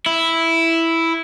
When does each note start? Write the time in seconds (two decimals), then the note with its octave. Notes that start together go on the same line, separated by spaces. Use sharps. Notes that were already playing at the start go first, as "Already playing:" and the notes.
0.06 E4